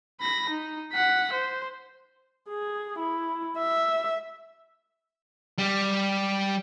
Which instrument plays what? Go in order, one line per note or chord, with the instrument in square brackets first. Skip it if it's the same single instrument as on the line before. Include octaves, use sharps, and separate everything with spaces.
[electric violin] B5 A#6
D#4
F#5 B6
C5
[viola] G#4
E4
E5
[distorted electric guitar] G3